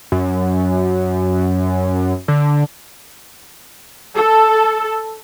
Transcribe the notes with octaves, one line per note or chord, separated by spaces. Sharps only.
F#2
D3
A4